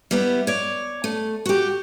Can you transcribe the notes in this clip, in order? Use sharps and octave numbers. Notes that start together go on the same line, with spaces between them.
G3 B3 E4
C#5 D5
A3
F#4 G4